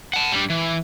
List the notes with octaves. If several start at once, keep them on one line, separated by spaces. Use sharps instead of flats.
F#5 A5
G3 D4
E3